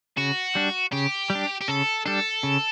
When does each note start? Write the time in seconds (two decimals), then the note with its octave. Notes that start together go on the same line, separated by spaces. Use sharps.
0.17 C#3 F#4
0.55 G3 D4
0.92 C#3 G4
1.30 G3
1.35 D4
1.61 G4
1.68 C#3 A4
2.06 G3 D4 A4
2.43 C#3